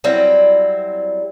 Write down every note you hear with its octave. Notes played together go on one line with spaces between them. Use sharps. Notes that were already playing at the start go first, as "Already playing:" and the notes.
F#3 G3 C4 E4